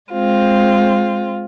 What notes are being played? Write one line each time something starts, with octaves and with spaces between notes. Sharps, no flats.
G#3 C4 F4